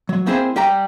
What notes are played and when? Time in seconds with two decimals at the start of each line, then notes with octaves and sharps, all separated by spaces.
0.09 F#3
0.26 A#3 C4 E4 G#4 C5
0.56 G3 G4 G5 A#5